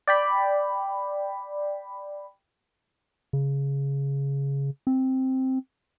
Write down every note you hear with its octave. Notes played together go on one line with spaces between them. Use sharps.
D5 G5 B5
C#3
C4